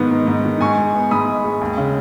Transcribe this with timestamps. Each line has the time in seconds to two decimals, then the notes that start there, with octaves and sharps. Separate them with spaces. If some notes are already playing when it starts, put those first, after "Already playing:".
Already playing: G#2 D#3 B3
0.11 G#2
0.27 G#2
0.45 D#3
0.61 G#2 G#5 C#6
0.78 G#3
0.94 B3
1.11 G#2 B5 D#6
1.28 G#2
1.44 G#3
1.61 D#2
1.78 C#3